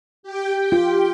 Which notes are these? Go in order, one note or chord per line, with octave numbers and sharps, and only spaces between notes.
G4 G5
F4